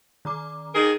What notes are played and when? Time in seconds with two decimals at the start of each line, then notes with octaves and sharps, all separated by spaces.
0.25 D#3 A#5 D6
0.74 D#3 G#4 A#4